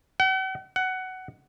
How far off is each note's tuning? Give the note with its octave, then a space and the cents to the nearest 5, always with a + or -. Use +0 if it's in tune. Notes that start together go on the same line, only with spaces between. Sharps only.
F#5 +45
F#5 +15